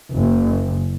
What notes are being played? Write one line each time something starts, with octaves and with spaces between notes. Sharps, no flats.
F#1